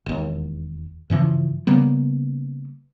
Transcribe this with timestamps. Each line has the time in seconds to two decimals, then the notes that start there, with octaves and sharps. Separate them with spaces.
0.06 E1 D#2
1.10 G2 C#3 E3 F3
1.67 C#3 G3 A#3 B3